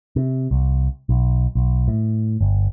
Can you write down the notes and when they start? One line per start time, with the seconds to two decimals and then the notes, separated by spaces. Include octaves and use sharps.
0.16 C3
0.51 C2
1.09 B1
1.55 B1
1.88 A2
2.41 G1